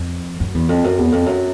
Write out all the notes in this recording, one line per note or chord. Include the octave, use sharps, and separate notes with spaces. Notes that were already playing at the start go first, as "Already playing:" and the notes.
Already playing: F2
F#2
E2
F2
F#2
E2
F2
F#2